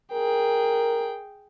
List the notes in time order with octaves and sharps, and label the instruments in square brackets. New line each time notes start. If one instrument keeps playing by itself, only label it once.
[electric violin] G#4 G5 [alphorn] A#4